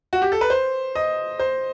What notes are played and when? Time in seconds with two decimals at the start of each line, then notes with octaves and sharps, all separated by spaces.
0.13 F#4
0.22 G4
0.32 A4
0.41 B4
0.50 C5
0.95 D#5
1.39 C5